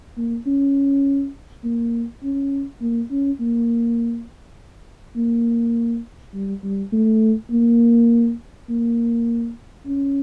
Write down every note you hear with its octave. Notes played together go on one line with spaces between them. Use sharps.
A#3
C#4
A#3
C#4
A#3
C#4
A#3
A#3
G3
G3
A3
A#3
A#3
C#4